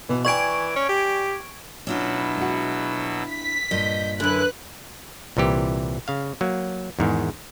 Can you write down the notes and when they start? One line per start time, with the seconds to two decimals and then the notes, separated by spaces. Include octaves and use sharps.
0.09 B2 E3
0.25 E3 D5 G5 G#5 C#6 G#6 D7
0.76 C#4
0.89 G4
1.87 B2 F#3 C#4 D4 E4 F4 E6
2.37 G#3 F#4
3.30 B6
3.71 G2 A#2 D#5 G6
4.20 F#2 D3 E4 B4 F#6
5.37 C2 A#2 E3 G4
6.08 C#3 F5
6.41 F#3 A#3
6.99 E2 G#2 D#3